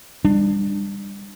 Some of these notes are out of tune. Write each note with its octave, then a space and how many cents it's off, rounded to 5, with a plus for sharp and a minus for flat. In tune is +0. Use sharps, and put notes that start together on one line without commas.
G3 +30 D4 +20